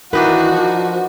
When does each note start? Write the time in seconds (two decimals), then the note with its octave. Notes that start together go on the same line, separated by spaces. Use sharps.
0.13 D#3 E3 D4 D#4 F#4 A#4 B4
0.52 F3